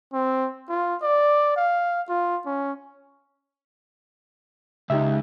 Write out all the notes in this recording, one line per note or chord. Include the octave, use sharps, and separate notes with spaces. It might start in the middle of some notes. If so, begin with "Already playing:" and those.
C4
F4
D5
F5
F4
C#4
C#2 D#4 G4 E5